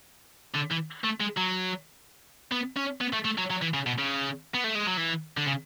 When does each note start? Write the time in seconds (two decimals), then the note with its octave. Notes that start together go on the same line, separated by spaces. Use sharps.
0.55 D3
0.71 E3
1.04 A3
1.21 G#3
1.37 F#3
2.52 B3
2.77 C#4
3.01 B3
3.13 A3
3.25 A3
3.38 F#3
3.50 F#3
3.62 E3
3.74 C#3
3.87 B2
3.99 C#3
4.54 B3
4.64 A3
4.75 G#3
4.87 F#3
4.97 E3
5.37 D3
5.47 C#3